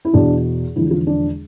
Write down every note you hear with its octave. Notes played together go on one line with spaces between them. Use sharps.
E4
E2 B2 D4
E1 E2 D3 F3 E4
F4
D4